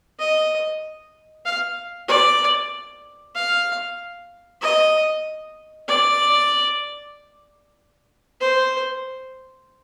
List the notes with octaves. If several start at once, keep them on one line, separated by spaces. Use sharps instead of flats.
D#5
F5
D5
F5
D#5
D5
C5